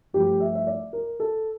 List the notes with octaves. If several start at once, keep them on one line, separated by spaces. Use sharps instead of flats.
G2 F3 A3 G4
E5
E5
D5
A#4
A4